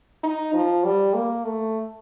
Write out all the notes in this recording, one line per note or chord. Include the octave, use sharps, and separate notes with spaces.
D#4
F3
G3
A#3
A3